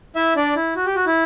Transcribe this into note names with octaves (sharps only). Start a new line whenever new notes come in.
E4 E5
D4 D5
E4
F#4
G4
F#4
E4